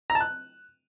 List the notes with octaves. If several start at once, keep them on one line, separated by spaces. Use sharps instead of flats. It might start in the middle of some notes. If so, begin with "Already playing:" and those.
A#5
A5
F#6